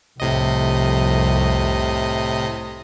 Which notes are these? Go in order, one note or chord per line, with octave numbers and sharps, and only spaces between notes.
C2 F2 A2 C3 D#5